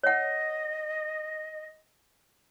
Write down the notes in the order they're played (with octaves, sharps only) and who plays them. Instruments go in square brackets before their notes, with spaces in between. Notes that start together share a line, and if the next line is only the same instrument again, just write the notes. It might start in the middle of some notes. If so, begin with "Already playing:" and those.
[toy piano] C#5 F#5 [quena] D#5